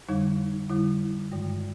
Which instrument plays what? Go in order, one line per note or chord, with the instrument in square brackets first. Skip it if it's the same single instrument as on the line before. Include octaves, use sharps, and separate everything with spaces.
[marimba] F2 D3 G3 D#4
F2 D3 G3 E4
G2 D#3 G#3